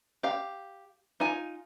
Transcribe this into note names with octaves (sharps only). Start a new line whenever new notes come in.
G4 F5
D#4 F4 G#5